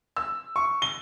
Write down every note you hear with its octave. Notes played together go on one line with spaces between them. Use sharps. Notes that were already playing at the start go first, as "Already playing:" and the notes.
E6
C#6
G7